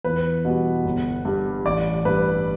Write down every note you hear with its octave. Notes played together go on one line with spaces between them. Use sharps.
E2 B4
B2 G3
G1
G2 G3
A1 D5
G2 G3 B4